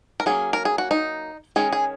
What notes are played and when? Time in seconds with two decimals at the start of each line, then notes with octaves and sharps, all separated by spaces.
0.20 A#4
0.26 F#3 A#3 C#4 G#4
0.53 A#4
0.65 G#4
0.78 F#4
0.91 D#4
1.56 D#3 G#3 C#4 G#4
1.72 G#4